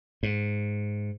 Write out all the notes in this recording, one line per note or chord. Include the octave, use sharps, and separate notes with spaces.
G#2